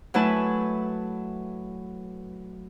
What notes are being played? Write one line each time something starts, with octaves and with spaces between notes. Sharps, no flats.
F#3 A3 E4 B4 G#5 A5